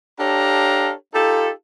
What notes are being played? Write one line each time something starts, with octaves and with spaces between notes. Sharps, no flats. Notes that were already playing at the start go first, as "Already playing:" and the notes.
D4 G4 A4 C#5 F5 A#5
D#4 F4 G4 A4